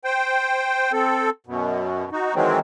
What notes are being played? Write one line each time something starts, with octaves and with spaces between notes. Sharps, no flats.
C5 G5
C4 A4
F#2 B2
D#4 F#4
D#3 E3 F#3 G#3 C4